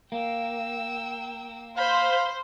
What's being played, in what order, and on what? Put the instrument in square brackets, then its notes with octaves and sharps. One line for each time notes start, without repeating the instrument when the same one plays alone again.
[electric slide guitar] A#3 [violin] G5 E6
[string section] C5 [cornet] F5 [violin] B5 G6